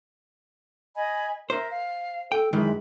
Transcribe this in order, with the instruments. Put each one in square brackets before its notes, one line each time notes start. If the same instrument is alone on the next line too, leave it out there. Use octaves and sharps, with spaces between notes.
[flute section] D#5 G#5 B5
[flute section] A#4 E5 [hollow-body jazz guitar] C5
[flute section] F5
[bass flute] A4 [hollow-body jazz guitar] G5
[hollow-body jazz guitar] F#2 D#3 E3 [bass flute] G#3 [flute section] C5 B5